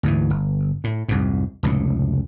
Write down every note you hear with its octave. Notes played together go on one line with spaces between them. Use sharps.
D2 G#2 E3
G1
A2
C2 F2 G#2
F1 C#2 A2